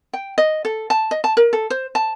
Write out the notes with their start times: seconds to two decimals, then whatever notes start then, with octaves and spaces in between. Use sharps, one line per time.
0.13 G5
0.38 D#5
0.65 A4
0.90 A5
1.11 D#5
1.24 A5
1.37 A#4
1.53 A4
1.70 C5
1.95 A5